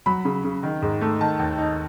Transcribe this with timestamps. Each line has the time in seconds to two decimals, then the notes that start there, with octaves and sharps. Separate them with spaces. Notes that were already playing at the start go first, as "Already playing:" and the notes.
0.06 F#3 B5
0.25 C#3
0.44 C#3
0.63 D#3
0.82 G#2
1.01 A3
1.20 D#3 A5
1.39 D#2
1.58 D#4